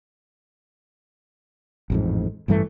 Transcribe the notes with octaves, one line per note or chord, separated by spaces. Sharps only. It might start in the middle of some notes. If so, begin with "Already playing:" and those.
A1 F2 G#2
A1 G2 E3 A3